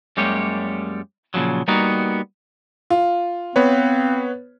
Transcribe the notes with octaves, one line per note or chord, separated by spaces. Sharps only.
F#2 G3 G#3 A#3 G4 C#5
A#2 C#3 F3 F#3
G3 A#3 B3 D#4 F#4
F4
B3 C4 B4 C#5